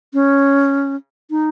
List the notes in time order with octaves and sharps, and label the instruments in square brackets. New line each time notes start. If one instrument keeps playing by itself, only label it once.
[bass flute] C#4
D#4